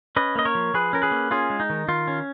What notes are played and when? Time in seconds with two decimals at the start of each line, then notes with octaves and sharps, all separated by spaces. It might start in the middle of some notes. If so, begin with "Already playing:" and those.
0.16 C#4 B4 D#5
0.35 A#3 D#5
0.45 A#4 C#5
0.55 F3
0.74 F3 G#4 B4
0.93 C#4 A#4
1.02 G#4 B4
1.11 A#3
1.31 C#4 F4 G#4
1.50 G#3
1.60 D#4
1.70 D#3
1.88 D#3 F4
2.08 C#4